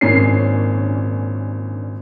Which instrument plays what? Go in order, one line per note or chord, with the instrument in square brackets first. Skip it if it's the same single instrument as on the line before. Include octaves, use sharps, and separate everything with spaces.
[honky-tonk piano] G#1 A#2 C#4 D4 C7